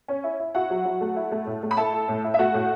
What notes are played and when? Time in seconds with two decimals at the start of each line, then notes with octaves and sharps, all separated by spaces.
0.08 C#4
0.24 E4
0.39 E4
0.55 E4 F#4 F#5
0.70 F#3
0.85 F#3
1.01 A3
1.16 E4
1.32 A3
1.47 A2
1.63 A3
1.71 B5
1.77 E4 A4 A5
1.93 E4
2.08 A2
2.24 E4
2.34 E5
2.39 A3 F#4 F#5
2.54 A2